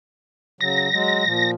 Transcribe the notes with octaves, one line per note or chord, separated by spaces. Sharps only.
C#3 F#3 A#6
F#3 G#3
A#2 F3